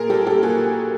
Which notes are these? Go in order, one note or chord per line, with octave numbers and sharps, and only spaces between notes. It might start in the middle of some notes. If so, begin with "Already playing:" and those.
Already playing: A#2 G#4 A#4
G3 G4 A4
G4 A4
A#2 F#4 G#4